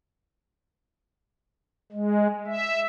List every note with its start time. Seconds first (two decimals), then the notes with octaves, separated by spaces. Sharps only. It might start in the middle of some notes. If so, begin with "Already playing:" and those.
1.92 G#3
2.47 E5